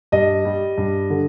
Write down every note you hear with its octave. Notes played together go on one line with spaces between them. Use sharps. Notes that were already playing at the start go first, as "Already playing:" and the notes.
G2 D#5
G3
G2
D3